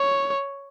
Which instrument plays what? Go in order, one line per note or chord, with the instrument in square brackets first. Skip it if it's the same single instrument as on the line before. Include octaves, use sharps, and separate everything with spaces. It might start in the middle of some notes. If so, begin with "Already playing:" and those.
Already playing: [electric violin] C#5